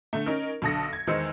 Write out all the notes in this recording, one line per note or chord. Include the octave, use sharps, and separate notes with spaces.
D3 A3
C#4 D#4 A#4
B1 D3 A4 D#6 A#6 C#7
G#6
E2 D#3 G#3 C5 E6 C#7